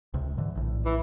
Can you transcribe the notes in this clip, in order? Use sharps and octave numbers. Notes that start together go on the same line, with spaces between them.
C#2 C3
G#2 D3 E3
A#1 A2
E3